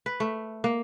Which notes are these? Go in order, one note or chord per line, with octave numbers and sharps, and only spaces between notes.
B4
A3
A#3